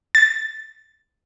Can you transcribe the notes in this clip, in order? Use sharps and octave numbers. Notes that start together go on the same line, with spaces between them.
A6